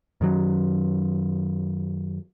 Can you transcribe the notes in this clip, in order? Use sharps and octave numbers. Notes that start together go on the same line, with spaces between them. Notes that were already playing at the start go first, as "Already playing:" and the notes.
F#2 D#3 F#3